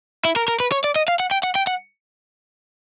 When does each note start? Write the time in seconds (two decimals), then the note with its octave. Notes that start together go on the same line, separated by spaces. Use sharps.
0.25 E4
0.36 A#4
0.48 A#4
0.60 B4
0.72 C#5
0.84 D5
0.96 D#5
1.08 F5
1.20 F#5
1.31 G5
1.43 F#5
1.55 G5
1.67 F#5